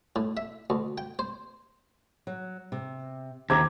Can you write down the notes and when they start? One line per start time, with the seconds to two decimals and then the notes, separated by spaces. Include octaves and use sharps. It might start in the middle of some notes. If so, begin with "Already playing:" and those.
0.16 A2
0.37 E5
0.70 D2
0.98 G5
1.19 C5
2.27 F#3
2.72 C3
3.50 D#2 C5 G5 A#5 D6 G#6